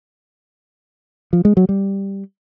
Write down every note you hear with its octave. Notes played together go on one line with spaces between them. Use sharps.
F3
G#3
F#3
G3